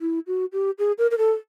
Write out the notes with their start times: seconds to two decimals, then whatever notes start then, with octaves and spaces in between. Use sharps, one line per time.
0.01 E4
0.27 F#4
0.53 G4
0.79 G#4
0.98 A#4
1.11 A#4
1.18 A4